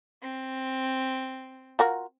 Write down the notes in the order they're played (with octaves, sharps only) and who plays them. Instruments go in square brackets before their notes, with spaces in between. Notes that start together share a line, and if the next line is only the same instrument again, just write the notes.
[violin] C4
[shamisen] F4 F#4 A#4